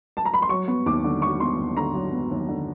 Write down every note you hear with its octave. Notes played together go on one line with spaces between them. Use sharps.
A5
A#5
B5
C6
F#3 C#6
B3
D#2 D6
D3
F#3 C#6
B3 C6
D#2
D3 A#5
F#3
B3
D#2
D3